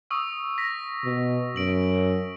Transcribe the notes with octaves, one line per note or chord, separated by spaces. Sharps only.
C#6 D#6 E6
A#6 B6
B2
F#2 D7 F#7